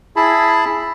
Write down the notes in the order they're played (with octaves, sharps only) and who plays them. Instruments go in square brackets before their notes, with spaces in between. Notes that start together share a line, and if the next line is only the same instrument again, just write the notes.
[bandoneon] E4 G#4 A5 B5